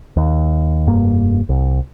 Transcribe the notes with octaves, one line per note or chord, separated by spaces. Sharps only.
D#2
F1 G2 A#3
C2